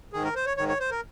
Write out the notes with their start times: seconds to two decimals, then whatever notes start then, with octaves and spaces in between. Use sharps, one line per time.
0.13 G#2 D#3 G#4
0.24 A#4
0.35 C5
0.46 C#5
0.57 G#2 D#3 C#5
0.68 C#5
0.80 C5
0.91 A#4